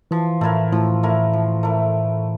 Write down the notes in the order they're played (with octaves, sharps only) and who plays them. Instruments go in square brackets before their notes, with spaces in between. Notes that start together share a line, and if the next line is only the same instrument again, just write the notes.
[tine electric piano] E3 [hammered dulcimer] F3
[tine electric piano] A2 [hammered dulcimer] A3 E4 A#4
[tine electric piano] A2 [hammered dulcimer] F3
[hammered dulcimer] A3 E4 A#4
F3
A3 E4 A#4